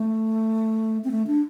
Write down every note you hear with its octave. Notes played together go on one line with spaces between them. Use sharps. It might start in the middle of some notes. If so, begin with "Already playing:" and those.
Already playing: A3
C4
A3
D4